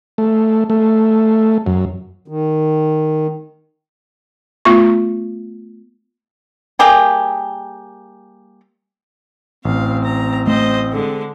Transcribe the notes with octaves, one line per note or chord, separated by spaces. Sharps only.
A3
A3
F#2
D#3
A3 B3 F4 C#6
G3 A#3 G4 G#4
A1 C4 F5
A#5
A3 C5 D#5
D3 G#3